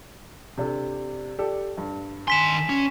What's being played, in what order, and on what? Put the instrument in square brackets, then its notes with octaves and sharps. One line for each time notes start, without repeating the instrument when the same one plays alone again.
[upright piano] C3 D4 A4
G4 A4 D5
G2
[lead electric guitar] D#3 C6 [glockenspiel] G#5 B6 E7
[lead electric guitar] C#4